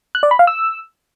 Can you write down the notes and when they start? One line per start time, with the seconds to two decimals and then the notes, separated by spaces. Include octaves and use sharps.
0.15 F#6
0.23 D5
0.31 B5
0.39 F5
0.47 E6